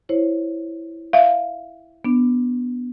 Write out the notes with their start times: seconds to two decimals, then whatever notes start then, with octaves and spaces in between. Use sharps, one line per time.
0.09 E4 C5 C#5
1.13 E5 F5
2.05 B3 D4